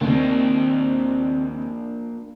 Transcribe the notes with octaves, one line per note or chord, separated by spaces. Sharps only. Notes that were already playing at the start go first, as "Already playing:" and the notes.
D#2 A#3 C4 D4